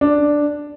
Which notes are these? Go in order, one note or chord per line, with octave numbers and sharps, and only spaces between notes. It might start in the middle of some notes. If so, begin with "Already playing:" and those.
D4